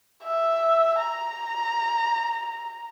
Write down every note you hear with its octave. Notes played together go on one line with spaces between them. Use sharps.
E5
A#5